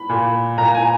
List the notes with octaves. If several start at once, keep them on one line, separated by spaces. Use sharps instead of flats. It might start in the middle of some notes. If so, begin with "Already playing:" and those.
Already playing: B5
A#2
A#2 A#5
G#5